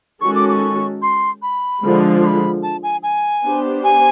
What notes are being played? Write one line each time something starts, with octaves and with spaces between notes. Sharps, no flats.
D#3 G#3 C#4 F#4 A4 C#6
D6
D6
C#6
C6
B5
D3 F3 G#3
C6
B5
A5
G#5
G#5
B3 D4 G4 C5
G#5